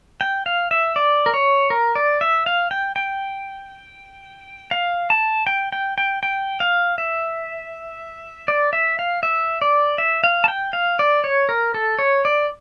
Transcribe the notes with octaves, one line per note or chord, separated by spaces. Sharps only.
G5
F5
E5
D5
A#4
C#5
A#4
D5
E5
F5
G5
G5
F5
A5
G5
G5
G5
G5
F5
E5
D5
E5
F5
E5
D5
E5
F5
A5
G5
F5
D5
C#5
A#4
A4
C#5
D5